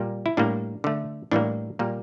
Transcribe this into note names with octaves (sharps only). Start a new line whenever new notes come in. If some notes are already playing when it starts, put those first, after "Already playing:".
Already playing: A#2 G3 A#3
E4
A2 G3 A#3 D4
D3 A3
A2 E3 G3 A#3 D4
A#2 G3 A#3